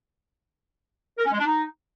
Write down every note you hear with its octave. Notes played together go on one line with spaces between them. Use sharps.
A#4
C#4
G#3
D4
D#4